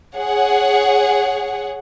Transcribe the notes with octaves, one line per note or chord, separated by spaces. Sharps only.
G#4 C#5 F#5